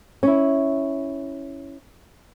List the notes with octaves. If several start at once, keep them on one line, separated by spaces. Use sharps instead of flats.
C#4 E4